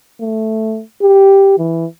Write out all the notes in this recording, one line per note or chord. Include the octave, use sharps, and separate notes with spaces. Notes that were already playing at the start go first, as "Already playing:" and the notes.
A3
G4
E3